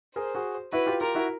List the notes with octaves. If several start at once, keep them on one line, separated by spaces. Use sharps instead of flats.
G#4 A#4 C5
F#4 G#4
E4 F#4 B4
F4 G4
F4 G4 A#4
E4 F#4